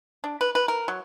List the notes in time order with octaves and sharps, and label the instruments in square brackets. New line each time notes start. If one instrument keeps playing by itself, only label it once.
[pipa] D4
B4
B4
A#4
F#3